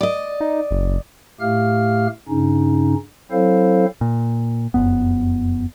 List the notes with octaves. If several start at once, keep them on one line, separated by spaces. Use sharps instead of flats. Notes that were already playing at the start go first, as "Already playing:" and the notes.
D5 D#5
D#4
F#1
A2 A3 G4 F5 F6
G2 C#3 C#4 D#4
F#3 C4 E4 A4 C5 F5
A#2
F1 F#2 B3